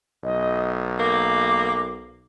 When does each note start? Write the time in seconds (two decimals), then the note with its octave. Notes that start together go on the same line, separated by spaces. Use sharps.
0.24 B1 D#5
0.99 A#3 D6